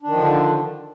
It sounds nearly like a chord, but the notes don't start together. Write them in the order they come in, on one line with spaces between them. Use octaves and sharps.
D4 D#3 F3 D3